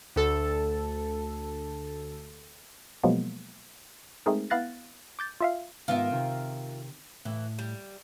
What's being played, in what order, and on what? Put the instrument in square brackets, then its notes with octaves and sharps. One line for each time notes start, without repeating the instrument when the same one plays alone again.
[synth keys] D2 A4
[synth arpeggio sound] B2 F3 F#3 G#3 A#3 B3
G#3 A3 C4 D#4 G#4 A#4
B3 E4 F5 F#6 A6 A#6
D6 G6 A6
F4 E5 F5
[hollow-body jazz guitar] G#2 D#3 B3 [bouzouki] F4 A#4 E5
[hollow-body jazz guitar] C3 D#3
[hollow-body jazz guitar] A2 [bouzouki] E3
[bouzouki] G3